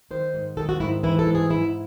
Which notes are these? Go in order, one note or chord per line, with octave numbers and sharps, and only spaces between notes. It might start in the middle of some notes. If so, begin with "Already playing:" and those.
D#3 C5
G#2
D#3 A4
F#4
G#2 E4
E3 E4
A4
G#2
G#4
G#2 E4